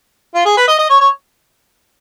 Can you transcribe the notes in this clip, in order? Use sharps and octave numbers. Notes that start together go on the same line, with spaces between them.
F4
G#4
B4
D#5
D#5
C#5
C#5